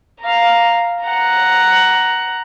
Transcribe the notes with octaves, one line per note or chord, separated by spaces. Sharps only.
F5 A#5
F#5 A#5